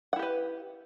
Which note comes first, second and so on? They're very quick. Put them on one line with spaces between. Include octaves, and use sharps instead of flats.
F#5 E4 G4 B4